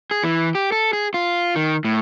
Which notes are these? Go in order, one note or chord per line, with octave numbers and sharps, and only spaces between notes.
G#4
E3
G4
A4
G#4
F4
D#3
A2